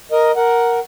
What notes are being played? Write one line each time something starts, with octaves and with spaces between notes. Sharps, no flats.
A#4 D#5
A#4 F#5